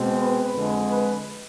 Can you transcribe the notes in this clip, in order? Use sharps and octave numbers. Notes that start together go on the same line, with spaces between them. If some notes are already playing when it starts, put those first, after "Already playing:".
Already playing: B2 G#3 C4
B4
F2 D3 G#3
B4